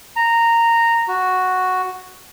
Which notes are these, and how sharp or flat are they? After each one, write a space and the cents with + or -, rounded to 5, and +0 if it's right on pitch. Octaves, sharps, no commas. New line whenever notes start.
A#5 -10
F#4 +0